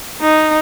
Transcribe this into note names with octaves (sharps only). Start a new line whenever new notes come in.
D#4